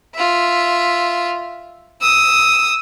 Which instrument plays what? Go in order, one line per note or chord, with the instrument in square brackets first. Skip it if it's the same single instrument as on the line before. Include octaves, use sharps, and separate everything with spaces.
[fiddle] F4 E5
D#6 E6